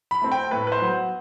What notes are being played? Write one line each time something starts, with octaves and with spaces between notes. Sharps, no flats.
B5
A3 C4
G5
A2 B4
B4
C5
F#3 B3